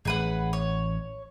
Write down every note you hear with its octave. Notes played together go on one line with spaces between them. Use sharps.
A1 G#4 B4 F#5
C#5